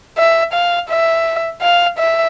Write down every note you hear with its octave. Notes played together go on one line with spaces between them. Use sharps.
E5
F5
E5
F5
E5